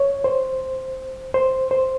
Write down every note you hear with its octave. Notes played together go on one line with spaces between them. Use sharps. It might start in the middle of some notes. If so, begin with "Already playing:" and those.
Already playing: C#5
C5
C5
C5